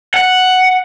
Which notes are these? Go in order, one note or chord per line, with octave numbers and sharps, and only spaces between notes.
F#5